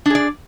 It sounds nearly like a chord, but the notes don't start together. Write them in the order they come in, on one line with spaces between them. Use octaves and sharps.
D4 G#4 D5